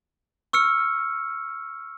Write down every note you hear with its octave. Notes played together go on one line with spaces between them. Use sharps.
C#6 E6 F6 C#7